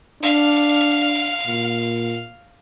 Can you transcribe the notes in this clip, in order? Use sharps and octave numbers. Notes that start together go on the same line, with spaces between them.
D4 F5
A#2